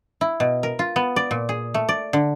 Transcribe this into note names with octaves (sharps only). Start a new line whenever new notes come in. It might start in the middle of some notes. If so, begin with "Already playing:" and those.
E4
B2
A#4
F4
B3
D5
A#2
G#4
A3
D5
D3